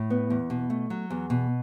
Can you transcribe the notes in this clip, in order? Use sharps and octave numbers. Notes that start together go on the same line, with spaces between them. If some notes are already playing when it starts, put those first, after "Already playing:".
Already playing: A2
B3
E2
B2
A3
F#3
E2
B2